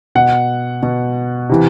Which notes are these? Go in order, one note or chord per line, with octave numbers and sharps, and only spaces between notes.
B2 F#5
B2
C3 E3